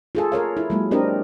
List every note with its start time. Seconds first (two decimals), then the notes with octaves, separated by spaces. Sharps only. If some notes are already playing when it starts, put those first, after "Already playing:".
0.15 F4 G#4 A4
0.32 A4 A#4 C#5 F5
0.57 E4
0.70 F#3 G#3 A#3
0.91 C4 D4 G4 A#4 D#5